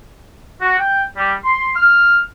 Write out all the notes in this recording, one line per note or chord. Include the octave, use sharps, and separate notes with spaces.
F#4
G5
G3
C6
F6